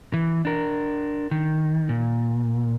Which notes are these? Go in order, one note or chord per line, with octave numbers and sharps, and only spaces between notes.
E3
D4 A#4
D#3
A#2